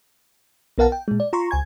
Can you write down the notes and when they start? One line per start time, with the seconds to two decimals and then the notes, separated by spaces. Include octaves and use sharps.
0.78 B1 B3 A#4 F5 F#5 A5
0.92 G5
1.08 A#2 G#3
1.20 D5
1.33 F4 A#5 C6 C#6
1.51 C#2 G#5 G#6